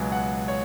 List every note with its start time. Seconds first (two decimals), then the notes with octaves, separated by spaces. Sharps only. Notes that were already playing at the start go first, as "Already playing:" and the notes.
Already playing: C#2 B2 F#3 G#5
0.12 F#5
0.48 C#5